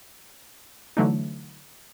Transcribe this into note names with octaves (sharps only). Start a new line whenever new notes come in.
D3 E3 F#3 A3 D4 D#4